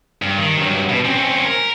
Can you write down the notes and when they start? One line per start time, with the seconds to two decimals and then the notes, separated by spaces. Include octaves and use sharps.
0.22 G2
0.37 D#3
0.57 G2 F#3
0.89 B2
1.05 C4 C#4
1.45 A#4